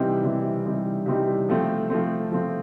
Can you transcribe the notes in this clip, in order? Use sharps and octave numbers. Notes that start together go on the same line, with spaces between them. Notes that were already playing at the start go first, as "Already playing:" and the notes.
Already playing: C3 E3 G3 C4 D#4
C3 E3 G3 C4 D#4
C3 E3 G3 C4 D#4
C3 E3 G3 C4 D#4
F3 A3 C4
F3 A3 C4
F3 A3 C4